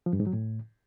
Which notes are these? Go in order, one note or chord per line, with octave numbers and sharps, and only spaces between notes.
F3
G2
G#2
F#3
A2